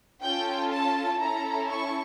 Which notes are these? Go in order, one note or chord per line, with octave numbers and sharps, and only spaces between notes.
C#4 F4 A4 G5
A5
C#4 E4 A4 A#5
C#6